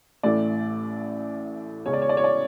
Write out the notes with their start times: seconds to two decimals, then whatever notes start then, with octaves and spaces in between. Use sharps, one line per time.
0.23 A1 A2 E3 A3 D5
1.86 E2 C#3 G#3 C#4 C#5
1.93 D5
2.02 C#5
2.09 D5
2.17 C#5
2.24 D5